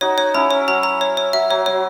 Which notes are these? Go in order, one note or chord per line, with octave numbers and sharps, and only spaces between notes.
D#4 F#4 C#5
C#5
C#4 E4 A#5
C#5
F#3 A#5
A#5
C#5
C#5
F#3 E5
F#3 C#5
F#3 C#5